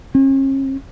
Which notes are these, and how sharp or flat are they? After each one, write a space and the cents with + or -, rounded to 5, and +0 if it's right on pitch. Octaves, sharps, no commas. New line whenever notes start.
C#4 -40